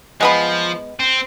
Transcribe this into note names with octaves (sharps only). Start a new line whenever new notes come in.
F3 G#3 B3 B5
C4